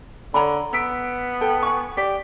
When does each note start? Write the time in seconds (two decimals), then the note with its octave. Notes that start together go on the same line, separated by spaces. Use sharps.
0.34 D3 C#5 A#5 B5
0.73 B3 E6 B6 D7
1.41 A4 G5
1.63 G#5 C#6
1.97 G4 D5 B6